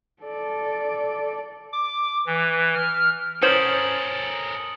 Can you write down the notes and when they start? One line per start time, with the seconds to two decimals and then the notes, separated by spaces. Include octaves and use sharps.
0.23 A4 D5
1.73 D6
2.27 E3
2.75 F6
3.42 C#4 A4 A#4 C5 C#5 D#6 F#7